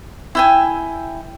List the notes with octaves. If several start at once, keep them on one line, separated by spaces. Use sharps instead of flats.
E4 G5 G#5